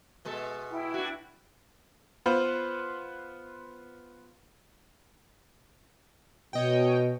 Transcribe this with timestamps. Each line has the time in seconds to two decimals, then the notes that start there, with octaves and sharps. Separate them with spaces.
0.25 B2 G#3 A4
0.71 E4 G5
0.94 D4 F#4
2.26 B3 F4 B4 C5
6.53 B2 C#5 D#5 G5